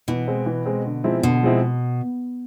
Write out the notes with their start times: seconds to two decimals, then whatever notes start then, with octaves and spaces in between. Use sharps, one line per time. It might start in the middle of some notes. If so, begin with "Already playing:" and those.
0.08 B2 E3
0.28 G#3 C4
0.46 E3
0.66 G#3 C4
0.85 D3
1.04 F3 G#3 C4 E4
1.23 B2 D3
1.43 F3 G#3 C4 E4